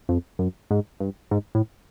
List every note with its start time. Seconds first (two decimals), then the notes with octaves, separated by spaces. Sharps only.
0.09 F2
0.39 F#2
0.71 G#2
1.00 G2
1.31 G#2
1.55 A2